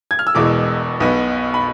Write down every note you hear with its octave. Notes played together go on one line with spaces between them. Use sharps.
G#6
F6
E6
E1 E2 B2 G#3 D6
B1 B2 B3
B5